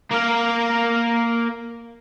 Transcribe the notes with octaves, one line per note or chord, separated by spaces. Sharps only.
A#3 A#4